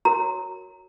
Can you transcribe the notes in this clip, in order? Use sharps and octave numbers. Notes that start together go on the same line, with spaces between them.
F#4 A#4 C#5 A#5